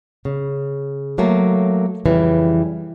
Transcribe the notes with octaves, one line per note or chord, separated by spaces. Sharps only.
C#3
F#3 A3 A#3
F2 C#3 E3 G3